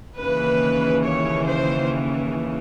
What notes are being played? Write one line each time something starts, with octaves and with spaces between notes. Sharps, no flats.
D#2 C#3 E3 B4
C#5
C5